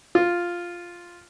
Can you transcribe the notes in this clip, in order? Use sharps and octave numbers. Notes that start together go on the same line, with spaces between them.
F4